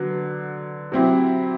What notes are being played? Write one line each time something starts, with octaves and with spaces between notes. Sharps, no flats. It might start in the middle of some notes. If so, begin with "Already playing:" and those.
Already playing: D3 F#3 B3
F#3 C4 E4 G4